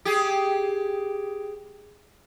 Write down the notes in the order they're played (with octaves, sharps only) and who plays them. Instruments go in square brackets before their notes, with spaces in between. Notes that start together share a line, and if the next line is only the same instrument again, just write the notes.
[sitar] G4 G#4